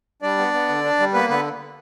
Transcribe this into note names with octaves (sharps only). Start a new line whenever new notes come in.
G3 D4 D5
B3
B3
D3
D4
G3
A#3 B3 B4
D3 B3 B4